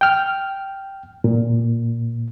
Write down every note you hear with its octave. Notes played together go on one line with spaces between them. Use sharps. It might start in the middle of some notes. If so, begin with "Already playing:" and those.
G5 F6
A#2